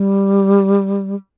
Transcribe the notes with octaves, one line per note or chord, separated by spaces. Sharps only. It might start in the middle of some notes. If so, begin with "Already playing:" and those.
Already playing: G3